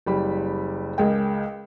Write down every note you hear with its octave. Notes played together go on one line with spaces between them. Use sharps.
F#1 G3 B5
C#2 G#3 A#4 G5